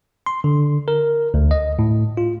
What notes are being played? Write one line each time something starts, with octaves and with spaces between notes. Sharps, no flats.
C6
D3
A#4
D2
D#5
A2
F4